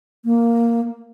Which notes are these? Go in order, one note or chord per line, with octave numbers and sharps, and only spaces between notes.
A#3